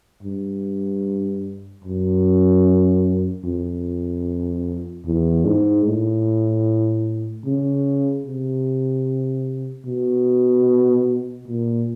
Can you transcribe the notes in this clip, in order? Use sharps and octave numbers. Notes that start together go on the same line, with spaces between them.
G2
F#2
F2
E2
G#2
A2
C#3
C3
B2
A#2